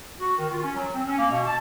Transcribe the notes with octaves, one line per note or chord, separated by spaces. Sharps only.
F#4
D#3
F4
C#4
F#3
C4
C#4
A#3
B2
A5